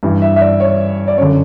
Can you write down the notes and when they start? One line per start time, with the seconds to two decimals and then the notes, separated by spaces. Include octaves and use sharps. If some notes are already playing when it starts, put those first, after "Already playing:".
0.03 G2 E3
0.22 E5
0.36 E5
0.41 D5
0.60 C#5
1.08 D5
1.17 F#2 C#5
1.22 D3